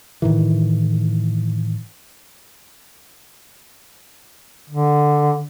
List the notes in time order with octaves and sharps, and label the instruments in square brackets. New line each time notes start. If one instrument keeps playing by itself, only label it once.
[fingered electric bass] A2 D#3 E3
[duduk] D3